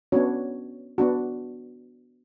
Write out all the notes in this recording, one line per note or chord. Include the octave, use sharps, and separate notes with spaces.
B3 C#4 D4 F#4 C#5
B3 D4 F#4